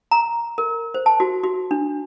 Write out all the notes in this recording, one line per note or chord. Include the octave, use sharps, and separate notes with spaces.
A#5
A#4
C5
A5
F#4
F#4
D4